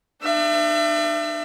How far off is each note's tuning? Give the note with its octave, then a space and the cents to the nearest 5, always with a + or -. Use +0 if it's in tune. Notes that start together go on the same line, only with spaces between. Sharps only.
D4 +45 E5 +35